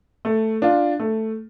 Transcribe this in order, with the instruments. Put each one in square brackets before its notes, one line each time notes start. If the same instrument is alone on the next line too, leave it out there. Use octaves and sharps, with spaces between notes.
[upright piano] A3
D4 F4
A3